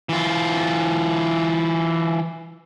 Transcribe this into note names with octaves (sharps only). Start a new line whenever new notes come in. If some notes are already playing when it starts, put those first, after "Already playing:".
E3 F4